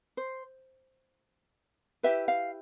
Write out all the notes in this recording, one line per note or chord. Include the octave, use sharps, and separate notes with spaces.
C5
E4 G4 B4 E5
F5